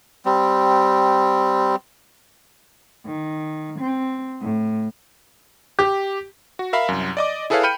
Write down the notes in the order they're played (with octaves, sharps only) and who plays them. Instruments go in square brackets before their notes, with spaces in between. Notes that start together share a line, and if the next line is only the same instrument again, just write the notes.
[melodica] G3 C4
[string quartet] D#3
C4
A2
[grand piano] G4
[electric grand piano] F#4
A#4 E5 F5 B5
C2 F#2
D5 D#5 D6
E4 G#4 A4 B4 C#5 F5
G5 B5 F6 G6 C#7 D#7